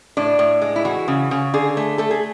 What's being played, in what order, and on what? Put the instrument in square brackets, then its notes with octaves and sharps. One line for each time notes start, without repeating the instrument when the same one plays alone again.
[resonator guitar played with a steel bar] A2 D4
A2
G#3
E4
E3 F#4
C#3
C#3
D3 G#4
A3
A3 A4
G#4